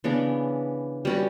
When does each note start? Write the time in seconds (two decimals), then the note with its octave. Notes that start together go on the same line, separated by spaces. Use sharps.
0.04 C#3 E3 B3 D4
1.05 G3 C#4 F#4 B4